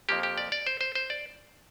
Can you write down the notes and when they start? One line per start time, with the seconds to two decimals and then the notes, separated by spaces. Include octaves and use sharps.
0.09 F2 F3 A#3 G4
0.23 G4
0.38 D5
0.52 D5
0.67 C5
0.81 C5
0.95 C5
1.10 D5